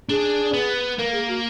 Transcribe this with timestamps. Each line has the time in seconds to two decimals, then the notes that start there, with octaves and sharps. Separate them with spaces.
0.09 D4 G#4
0.53 B3
0.98 A#3 A#4
1.13 G#4
1.28 F#4